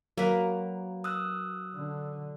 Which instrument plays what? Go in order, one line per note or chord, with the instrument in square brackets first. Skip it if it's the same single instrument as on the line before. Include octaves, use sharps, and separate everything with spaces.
[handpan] F#3 [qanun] A#3 B4
[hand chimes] D#6 E6 F#6
[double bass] D3